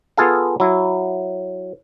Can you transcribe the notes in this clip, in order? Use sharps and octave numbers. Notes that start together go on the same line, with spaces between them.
B3 F4 G#4 A4 F5
F#3 E4